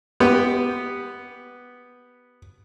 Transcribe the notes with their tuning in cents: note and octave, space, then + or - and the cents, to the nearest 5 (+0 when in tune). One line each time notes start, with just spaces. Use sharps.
B3 +0 G4 +5